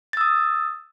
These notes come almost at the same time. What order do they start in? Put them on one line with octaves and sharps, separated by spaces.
A6 E6 D#6